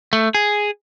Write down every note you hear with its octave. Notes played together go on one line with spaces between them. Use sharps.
A3
G#4